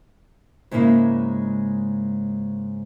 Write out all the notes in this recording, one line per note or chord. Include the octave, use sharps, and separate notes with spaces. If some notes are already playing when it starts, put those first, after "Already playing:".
G#2 C#3 G#3 A#3 E4